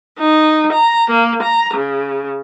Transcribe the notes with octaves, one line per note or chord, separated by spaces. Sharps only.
D#4
A#5
A#3
A#5
C#3